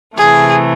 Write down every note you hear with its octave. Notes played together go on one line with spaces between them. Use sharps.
C3 E3 A3 G#4